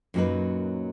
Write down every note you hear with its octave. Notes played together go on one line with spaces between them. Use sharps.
F#2 A#2 F#3 A#3 D#4 B4